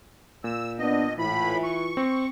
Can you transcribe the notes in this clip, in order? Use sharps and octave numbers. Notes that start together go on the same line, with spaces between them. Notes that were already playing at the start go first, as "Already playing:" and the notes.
A#2 E6
B3 D4 D#5
A2 E3 F4 B5
C#6
C4